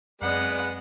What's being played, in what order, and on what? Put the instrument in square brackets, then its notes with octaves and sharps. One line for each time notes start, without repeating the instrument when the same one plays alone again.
[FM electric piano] F#2 C4 [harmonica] G#3 B3 [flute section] D5 [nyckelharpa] F#5